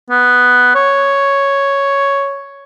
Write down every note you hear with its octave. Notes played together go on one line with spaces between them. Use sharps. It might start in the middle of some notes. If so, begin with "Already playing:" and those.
B3
C#5